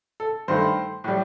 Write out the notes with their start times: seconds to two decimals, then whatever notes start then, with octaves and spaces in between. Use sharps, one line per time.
0.20 A4
0.48 G2 D#3 A3 C5
1.04 A2 G3